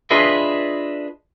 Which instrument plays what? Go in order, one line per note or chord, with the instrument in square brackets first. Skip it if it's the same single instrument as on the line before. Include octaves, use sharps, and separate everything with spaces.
[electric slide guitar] D4 F4 G#4 B4 D#5 E5